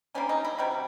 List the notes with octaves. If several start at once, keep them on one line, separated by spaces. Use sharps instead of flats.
D3 G3 A#3 C#4
D#4
E4
C3 D#3 G3 F#4